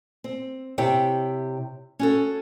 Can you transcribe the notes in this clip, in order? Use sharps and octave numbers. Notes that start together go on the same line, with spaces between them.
C4
C3 E4 G4 C#5 G5
C#4 F#4 A4